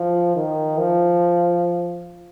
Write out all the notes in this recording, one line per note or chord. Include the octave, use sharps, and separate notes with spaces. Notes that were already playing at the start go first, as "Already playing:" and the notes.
Already playing: F3
D#3
F3